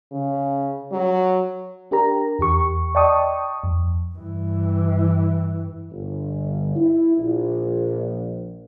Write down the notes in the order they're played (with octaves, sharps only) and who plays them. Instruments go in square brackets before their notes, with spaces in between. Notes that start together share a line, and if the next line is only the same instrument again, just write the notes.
[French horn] C#3
F#3
[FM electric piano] D4 G4 A#4 A#5
E2 G4 C#6
D5 D#5 G5 A5 C#6 D#6
F2
[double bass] G2 E3
[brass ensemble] G1
E4
A#1